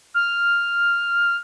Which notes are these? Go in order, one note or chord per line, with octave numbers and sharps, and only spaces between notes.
F6